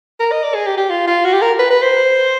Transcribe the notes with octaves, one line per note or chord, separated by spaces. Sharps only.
A#4
D#5
D5
G#4
G4
G4
F4
F4
F#4
G4
A#4
B4
B4
C5